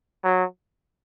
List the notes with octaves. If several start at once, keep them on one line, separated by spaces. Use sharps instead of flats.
F#3